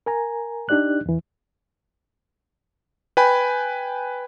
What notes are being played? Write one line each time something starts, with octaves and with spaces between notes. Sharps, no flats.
A#4 G#5 A#5
D4 D#4 G4 D5 F#6
E2 E3
B4 G5 G#5 B5